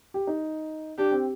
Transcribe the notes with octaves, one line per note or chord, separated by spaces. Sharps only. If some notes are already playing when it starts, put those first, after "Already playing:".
G4
D#4
D4 G4
C4